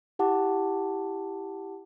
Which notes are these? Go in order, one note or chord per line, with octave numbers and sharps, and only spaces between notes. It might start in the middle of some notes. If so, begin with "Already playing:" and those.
E4 G4 F#5 A5 D6